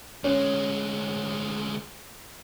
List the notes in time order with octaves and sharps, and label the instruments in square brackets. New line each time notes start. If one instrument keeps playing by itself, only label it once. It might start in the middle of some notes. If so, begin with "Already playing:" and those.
[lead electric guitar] D2 G#3 [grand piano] C#4